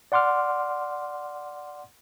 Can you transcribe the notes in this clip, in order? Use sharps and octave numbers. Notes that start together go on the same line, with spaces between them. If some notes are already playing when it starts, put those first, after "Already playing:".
D5 F#5 C6 D6 F6